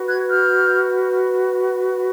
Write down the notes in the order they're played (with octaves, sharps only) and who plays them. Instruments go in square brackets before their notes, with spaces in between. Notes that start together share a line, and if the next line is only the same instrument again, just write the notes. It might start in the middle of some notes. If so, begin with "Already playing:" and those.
Already playing: [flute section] F#4 B4
F#6 G#6
F6 G6